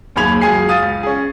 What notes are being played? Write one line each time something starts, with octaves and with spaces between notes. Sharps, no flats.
F#1 D#2 G#4 B5 G#6 F7
C#2 F#2 G#4 G#5 C7
F5 D#6 A6 D#7
C#2
C#4 G#4